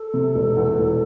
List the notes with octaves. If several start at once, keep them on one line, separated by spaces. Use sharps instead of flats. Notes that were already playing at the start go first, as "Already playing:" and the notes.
Already playing: A4
C3
E1
E2
E1